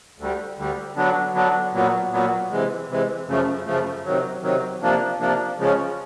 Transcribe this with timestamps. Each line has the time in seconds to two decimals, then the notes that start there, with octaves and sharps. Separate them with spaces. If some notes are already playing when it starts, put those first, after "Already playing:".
0.19 D2 D3 G3
0.58 D2 D3 G3
0.96 D3 F#3 B3 D4
1.34 D3 F#3 B3 D4
1.73 A#2 F#3 B3
2.12 A#2 F#3 B3
2.51 C3 E3 G#3
2.89 C3 E3 G#3
3.27 F#2 C#3 F3 A3
3.66 F#2 C#3 F3 A3
4.05 C3 D#3 F#3
4.42 C3 D#3 F#3
4.81 C3 F3 A#3 D4
5.19 C3 F3 A#3 D4
5.58 C#3 F3 G#3 C#4